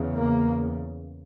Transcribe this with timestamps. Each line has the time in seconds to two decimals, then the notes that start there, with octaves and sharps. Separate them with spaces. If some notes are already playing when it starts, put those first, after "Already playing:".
Already playing: E2 C#3
0.16 A#3